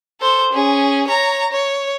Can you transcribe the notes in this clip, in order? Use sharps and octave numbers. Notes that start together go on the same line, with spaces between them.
A4 C5
C#4 G#4
C#5 A#5
C#5